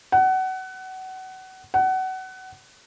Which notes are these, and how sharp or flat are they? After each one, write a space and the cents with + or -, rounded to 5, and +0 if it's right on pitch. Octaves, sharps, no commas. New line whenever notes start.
F#5 +25
F#5 +25